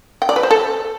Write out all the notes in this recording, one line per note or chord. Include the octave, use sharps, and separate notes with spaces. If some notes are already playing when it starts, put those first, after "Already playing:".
G5
D5
B4
C5
A4